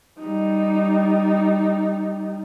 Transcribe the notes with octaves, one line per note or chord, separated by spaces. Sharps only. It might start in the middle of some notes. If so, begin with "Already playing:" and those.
G3 D#4